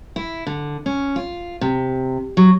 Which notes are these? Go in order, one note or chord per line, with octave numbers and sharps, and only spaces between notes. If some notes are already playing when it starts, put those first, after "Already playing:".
E4
D3
C#4
F4
C3
F#3